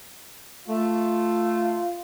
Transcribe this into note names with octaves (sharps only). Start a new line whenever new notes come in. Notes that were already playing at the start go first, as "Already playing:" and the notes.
A3 F4